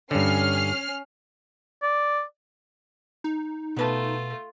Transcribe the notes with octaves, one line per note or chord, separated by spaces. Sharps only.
G2 D3 C#4 F6 C7
D5
D#4
B2 A3 F4 B4 A5